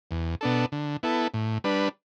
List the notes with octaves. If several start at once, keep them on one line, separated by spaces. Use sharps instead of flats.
E2
B2 B3 D4 A4
D3
B3 E4 A4
A2
G3 D4 B4